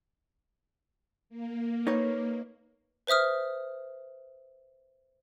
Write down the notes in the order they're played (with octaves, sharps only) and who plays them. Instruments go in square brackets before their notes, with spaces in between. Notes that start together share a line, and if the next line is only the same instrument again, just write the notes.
[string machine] A#3
[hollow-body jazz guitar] D#4 B4 C#5
[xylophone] B4 C5 E5 D#6 F6